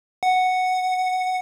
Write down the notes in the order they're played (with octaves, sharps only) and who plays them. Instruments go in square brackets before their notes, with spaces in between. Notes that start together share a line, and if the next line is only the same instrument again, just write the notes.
[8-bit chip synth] F#5